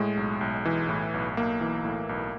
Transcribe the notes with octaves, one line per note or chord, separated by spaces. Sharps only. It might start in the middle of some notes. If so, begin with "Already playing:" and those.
Already playing: A2 G#3
B1
B1
E3
A2
B1
B1 A#3
E3
A2
B1